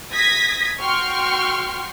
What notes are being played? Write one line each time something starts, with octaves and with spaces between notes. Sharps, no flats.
D#6 G#6 A#6 B6
F#4 G5 C6 C#6 F6